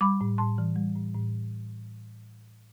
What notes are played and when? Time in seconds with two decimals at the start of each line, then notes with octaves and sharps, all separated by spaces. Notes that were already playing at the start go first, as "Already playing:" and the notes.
0.01 G3 B5 D6
0.21 A2
0.38 A2 A5 C6
0.58 E3
0.76 G3
0.96 A2
1.14 A2